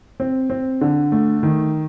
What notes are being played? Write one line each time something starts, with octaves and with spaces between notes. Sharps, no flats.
C4
C4
D3
A3
D#3